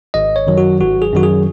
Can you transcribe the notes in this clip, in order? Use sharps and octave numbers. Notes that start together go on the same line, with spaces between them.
G#1 D#5
C#5
F#2 D#3 F#3
F#4
G#1 F#4
G#4
F#2 D#3 F#3 F#4
G#4